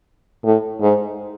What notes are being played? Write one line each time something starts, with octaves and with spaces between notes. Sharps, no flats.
A2
G#2